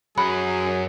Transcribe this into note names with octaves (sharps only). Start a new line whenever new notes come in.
F#2 F#3 G#4 F#5 B5